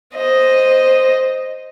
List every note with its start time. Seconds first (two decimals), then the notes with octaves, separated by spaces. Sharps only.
0.14 C5 D#5